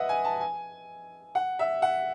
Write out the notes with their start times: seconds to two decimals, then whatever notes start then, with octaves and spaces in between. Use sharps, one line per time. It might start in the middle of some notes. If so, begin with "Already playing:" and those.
Already playing: B4 D#5 E5 F#5
0.09 G#5
0.25 A5
0.41 G#5
1.35 F#5
1.59 E5
1.82 F#5